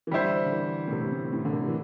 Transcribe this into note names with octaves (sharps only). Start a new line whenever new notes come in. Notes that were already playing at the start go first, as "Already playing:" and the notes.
E3
D3 G3 E4 C5
D3
E3
A2
C3
A2
A2
D3
C3
E3